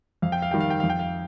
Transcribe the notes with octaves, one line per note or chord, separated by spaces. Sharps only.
F2 F5
G5
F5
D#3 G3 G5
F5
G5
F2 F5
G5
F5